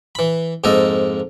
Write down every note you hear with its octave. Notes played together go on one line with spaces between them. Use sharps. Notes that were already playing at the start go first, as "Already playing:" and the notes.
E3 B5
F2 G#2 A#3 A4 D#5